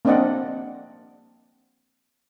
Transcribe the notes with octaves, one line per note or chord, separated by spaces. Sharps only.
A#3 C4 D4 D5 D#5 F#5